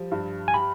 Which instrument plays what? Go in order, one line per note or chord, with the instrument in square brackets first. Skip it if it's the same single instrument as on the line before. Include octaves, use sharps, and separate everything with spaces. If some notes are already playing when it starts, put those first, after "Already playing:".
Already playing: [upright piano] F3 G3
G2
[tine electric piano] G#5
[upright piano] G4 [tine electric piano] B5